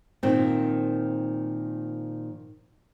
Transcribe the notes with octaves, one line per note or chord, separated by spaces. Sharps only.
A#2 D#3 F3 C4